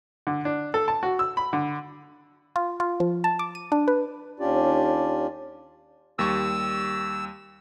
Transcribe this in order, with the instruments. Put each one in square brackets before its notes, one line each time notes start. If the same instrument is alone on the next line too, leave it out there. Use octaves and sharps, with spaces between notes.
[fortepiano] D3
D4
A4
A5
F#4
E6
B5
D3
[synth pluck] F4
F4
F3
A5
D6
D#7
D4
B4
[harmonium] D#2 C#4 D4 F4 G4 D5
[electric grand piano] D#2 G3 C#6 [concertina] E6